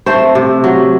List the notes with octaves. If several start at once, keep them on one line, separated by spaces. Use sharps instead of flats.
A3 C4 C5
C3
F#3